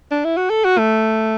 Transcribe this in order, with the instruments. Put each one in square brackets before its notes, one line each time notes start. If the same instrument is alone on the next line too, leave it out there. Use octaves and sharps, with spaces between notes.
[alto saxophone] D4
E4
F#4
A4
F#4
A3